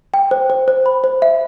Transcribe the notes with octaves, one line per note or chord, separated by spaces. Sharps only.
G5
C5
C5
C5
B5
C5
E5